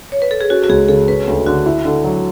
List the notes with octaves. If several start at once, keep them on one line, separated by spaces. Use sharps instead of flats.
C#5
B4
A4
G#4
C#4 F#4
F#4
C#2 G#4
C#3 A4
C#4 B4
D2
D3 F#4
E4
D3
F#3